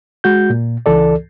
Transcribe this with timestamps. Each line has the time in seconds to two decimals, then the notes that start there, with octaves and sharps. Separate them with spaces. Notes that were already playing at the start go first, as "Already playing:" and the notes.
0.24 G#3 F#4 G6
0.50 A#2
0.86 C#2 E3 A4 D5